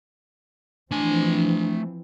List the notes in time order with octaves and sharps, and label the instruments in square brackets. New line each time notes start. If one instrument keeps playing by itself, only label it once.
[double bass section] E3 F3 C4 [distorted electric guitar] A3 G#5 [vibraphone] D4